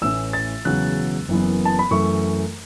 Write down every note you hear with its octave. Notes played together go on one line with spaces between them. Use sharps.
A1 A2 E3 C#4 E6
A6
E1 E2 C#3 F#3 F#6
F#1 F#2 E3 B3
A5
B5
F#2 E3 A3 C#6